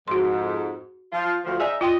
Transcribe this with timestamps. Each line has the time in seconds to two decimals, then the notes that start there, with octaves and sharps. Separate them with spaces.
0.08 F2 G#2 F#4 C6
1.12 F3 F4
1.44 D2 F3
1.60 D#4 G#4 D5 E5 G#5
1.81 F4 D#5 G5 C6